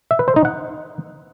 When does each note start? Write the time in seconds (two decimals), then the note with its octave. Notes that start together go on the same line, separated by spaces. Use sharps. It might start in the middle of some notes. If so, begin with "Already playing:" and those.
0.11 E5
0.19 B4
0.28 C5
0.36 D#4
0.45 F#5